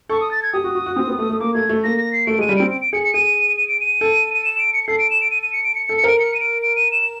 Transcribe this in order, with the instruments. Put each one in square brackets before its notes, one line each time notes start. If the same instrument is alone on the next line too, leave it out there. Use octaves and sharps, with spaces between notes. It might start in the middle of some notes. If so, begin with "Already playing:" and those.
[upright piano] A4 [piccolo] C#6
[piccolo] D#6
A6
G#6
[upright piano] G4 [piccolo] D#6
[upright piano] F#4
F#4
F#4
C4
B3
A3
A3
[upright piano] A#3 [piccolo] D6
[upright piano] A3 [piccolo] G#6
[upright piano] A3
[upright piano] A#3 [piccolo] A#6
[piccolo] A#6
C7
[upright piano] A3 [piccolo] D7
[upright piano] G#3 [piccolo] D#7
[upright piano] G3
[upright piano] C4 [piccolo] D7
[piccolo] D7
D7
[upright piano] G#4 [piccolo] C#7
[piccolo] C#7
[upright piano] G#4 [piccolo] D#7
[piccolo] D#7
D7
D#7
[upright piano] A4
[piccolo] D#7
E7
D7
C#7
C#7
[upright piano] A4 [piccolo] C7
[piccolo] D7
E7
D7
D#7
D#7
C#7
D7
C#7
C#7
[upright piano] A4
[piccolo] C#7
[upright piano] A#4 [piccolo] D7
[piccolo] C#7
D#7
D7
D7
D#7
E7